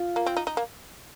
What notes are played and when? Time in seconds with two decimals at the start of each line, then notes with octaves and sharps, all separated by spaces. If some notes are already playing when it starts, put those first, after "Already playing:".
Already playing: F4
0.16 A#3
0.26 C4
0.37 D#4
0.47 D#4
0.57 A#3